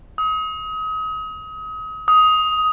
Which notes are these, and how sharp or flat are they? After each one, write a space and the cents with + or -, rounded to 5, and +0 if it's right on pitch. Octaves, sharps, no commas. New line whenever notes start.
D#6 +35
D#6 +15